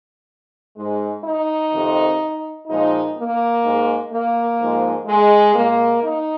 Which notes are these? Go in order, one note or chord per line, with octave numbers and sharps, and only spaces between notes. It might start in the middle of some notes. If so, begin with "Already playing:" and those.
G#2 G#3
D#4
F2 C3 D#3
A#2 F3 G#3 D#4
A#3
G#2 G#3
A#3
G#2 F3 G#3
G#3
A#2 G#3 A#3
D#4